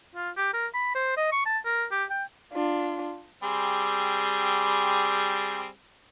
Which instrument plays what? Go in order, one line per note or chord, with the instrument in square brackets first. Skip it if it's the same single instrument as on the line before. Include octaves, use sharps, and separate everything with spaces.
[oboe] F4
G4
A#4
B5
C5
D#5
C#6
A5
A#4
G4
G5
[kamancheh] D4 F4
[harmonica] G3 C4 G#4